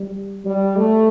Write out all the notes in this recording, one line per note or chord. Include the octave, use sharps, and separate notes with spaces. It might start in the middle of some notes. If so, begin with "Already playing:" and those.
Already playing: G3
G3
A3